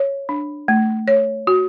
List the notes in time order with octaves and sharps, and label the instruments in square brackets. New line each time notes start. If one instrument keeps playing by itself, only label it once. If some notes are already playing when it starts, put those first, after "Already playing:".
Already playing: [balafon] C#5
D4
A3
C#5
F#4